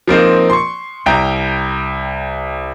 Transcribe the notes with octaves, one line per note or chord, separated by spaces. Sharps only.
F3 A#3 C4 D#4
C6 C#6
C2 G5 A#5